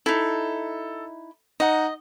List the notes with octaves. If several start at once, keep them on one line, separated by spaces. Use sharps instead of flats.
D#4 E4 A4
D#4 D#5 F#5 A#5